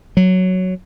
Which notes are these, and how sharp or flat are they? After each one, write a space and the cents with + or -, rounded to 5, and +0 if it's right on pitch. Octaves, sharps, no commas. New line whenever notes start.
F#3 +0